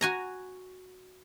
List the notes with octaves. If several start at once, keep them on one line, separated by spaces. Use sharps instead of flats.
F#4 G#5 A#5